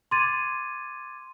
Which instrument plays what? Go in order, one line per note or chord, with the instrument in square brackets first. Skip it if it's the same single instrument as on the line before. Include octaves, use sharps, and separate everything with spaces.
[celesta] C6 D6 G#6 A6 D#7